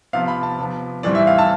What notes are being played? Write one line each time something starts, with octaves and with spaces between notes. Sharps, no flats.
C3 F3 B3 F5
B5
A5
C3 F3 B3
A2 E3 G3 C4 D5
E5
F5
A5